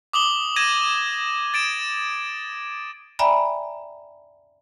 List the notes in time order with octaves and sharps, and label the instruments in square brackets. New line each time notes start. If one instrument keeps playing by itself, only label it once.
[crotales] D6 D#6 F#7 G7
G#6 A#6 D#7 E7
A6 D7 E7
[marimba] D5 E5 G5 G#5 A#5 B5